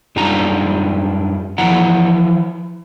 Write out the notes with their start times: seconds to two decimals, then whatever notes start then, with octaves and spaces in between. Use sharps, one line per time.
0.16 F#2 G3 D4 D#4 F4 A#5
1.58 E3 F3 E4 F#5 A#5